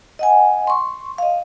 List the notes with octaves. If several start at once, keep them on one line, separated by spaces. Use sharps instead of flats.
D#5 F#5 G#5
C6 C#6
D#5 F5